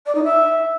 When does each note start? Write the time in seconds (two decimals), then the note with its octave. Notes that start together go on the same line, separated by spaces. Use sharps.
0.06 D5
0.15 D#4
0.24 E5